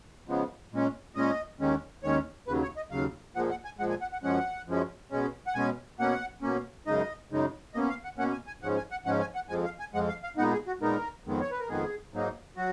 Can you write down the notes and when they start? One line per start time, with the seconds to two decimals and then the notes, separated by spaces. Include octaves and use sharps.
0.28 C#3 F3 G#3 B3
0.72 A#2 G#3 C#4
1.15 A#2 G#3 C#4 D#5
1.59 D#2 D#3 G#3 C#4
2.03 D#2 D#3 G#3 C#4 C#5
2.47 D#2 C#3 F#3 B4
2.62 C#5
2.77 D#5
2.91 D#2 C#3 F#3 F5
3.35 A#2 F3 G#3 F#5
3.50 F#5
3.65 G#5
3.79 A#2 F3 G#3 F#5
3.90 G#5
4.01 F#5
4.12 F#5
4.23 F#2 F3 G#3 C#4 F#5
4.67 F#2 F3 G#3 C#4
5.11 B2 G#3 C#4
5.47 F#5
5.55 B2 G#3 C#4 G#5
5.99 B2 A#3 C#4 F#5
6.42 B2 A#3 C#4
6.87 F#2 C#3 G#3 D#4 D#5
7.31 F#2 C#3 G#3 D#4
7.74 B2 A#3 C#4 D#5
7.89 F5
8.04 F#5
8.18 B2 A#3 C#4 F#5
8.32 G#5
8.47 G#5
8.63 G#2 F3 G#3 C#4 F#5
8.77 G#5
8.91 F#5
9.05 G#2 F3 G#3 C#4 F#5
9.20 G#5
9.35 F#5
9.49 F2 F3 G#3 G#5
9.64 F5
9.80 G#5
9.94 F2 F3 G#3 F#5
10.09 F5
10.23 F5
10.37 A#2 G#3 B3 D#4 F#5
10.52 G#4
10.67 F#4
10.81 A#2 G#3 B3 D#4 A#4
11.26 F2 D#3 G#3 B3
11.41 C#5
11.51 B4
11.59 A#4
11.69 F2 D#3 G#3 B3 G#4
12.13 G#2 F#3 A#3 D#4
12.57 F#3 F#4